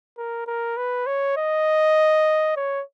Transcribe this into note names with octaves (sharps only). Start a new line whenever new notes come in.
A#4
A#4
B4
C#5
D#5
C#5